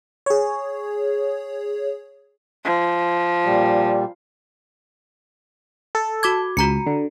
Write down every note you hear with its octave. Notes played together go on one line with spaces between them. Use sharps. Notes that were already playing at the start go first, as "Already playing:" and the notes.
G#4 C#5
F3
A#2 G3
A4
F#4 D6 G#6
C#2 F#4 A#5 C#7
D3